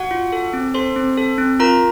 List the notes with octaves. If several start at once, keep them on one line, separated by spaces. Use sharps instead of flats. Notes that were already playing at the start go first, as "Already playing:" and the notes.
Already playing: F#4 F#5
F4
A4
C4
A4 C5 C6
C4
A4
C4
F4 A#4 A#5